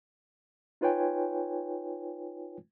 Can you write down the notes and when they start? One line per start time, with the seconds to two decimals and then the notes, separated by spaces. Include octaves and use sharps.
0.81 D#4 F4 B4 C#5 G5 G#5